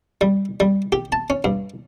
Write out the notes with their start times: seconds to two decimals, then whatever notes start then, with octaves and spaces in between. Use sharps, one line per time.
0.21 G3
0.60 G3
0.92 G4
1.12 A5
1.30 C#4
1.44 G2